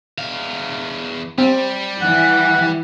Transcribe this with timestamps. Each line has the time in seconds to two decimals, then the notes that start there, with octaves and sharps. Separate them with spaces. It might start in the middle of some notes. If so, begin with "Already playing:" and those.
0.18 E2 F5
1.38 G3 C4
2.02 E3 F#5